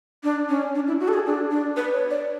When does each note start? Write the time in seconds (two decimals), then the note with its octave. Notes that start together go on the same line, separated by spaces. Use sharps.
0.24 D4
0.49 C#4
0.75 D4
0.87 E4
1.00 F#4
1.08 A4
1.14 G#4
1.26 D4
1.51 D4
1.76 B4
1.93 C#5
2.10 D5